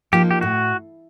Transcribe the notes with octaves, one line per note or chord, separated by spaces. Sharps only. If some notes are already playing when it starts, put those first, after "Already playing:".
F3 A#3 D#4 G4
G4
A2 F#4